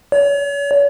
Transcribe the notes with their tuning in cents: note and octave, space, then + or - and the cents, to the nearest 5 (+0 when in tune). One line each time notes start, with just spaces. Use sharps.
C#5 +40